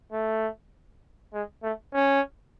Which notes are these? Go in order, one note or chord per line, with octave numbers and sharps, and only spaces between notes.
A3
G#3
A3
C#4